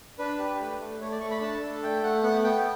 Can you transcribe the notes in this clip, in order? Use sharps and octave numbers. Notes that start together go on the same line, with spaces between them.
D4 B4
G4
A3
A3
A3 C#5
D5
A3 C#6
B5
D4 A5
A4
A3 G5
A3 F#5
B3 F#5
B3 G5